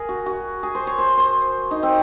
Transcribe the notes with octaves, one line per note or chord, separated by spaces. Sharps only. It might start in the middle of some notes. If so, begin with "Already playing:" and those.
Already playing: G#4 A#4
F#4
F#4
G#4
C5
C#5
C5
C5
D#4
C4